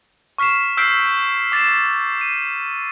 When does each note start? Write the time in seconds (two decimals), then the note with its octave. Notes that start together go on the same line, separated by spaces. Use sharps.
0.38 C#6 F6 B6 C7 E7
0.77 E6 F6 G6 B6 C7 D7
1.52 D6 A6 B6 C7 E7
2.21 D#7